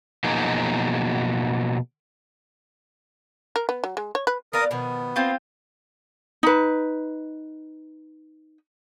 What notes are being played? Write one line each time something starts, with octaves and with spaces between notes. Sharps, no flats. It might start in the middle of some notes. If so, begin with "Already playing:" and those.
B2 F3 F#3 A#3 D#4 G#4
A#4
B3
F#3
G#3
C#5
B4
B3 A#4 D5 F5 D#6
B2 D#3 F3 B3
C4 F4
D#4 B4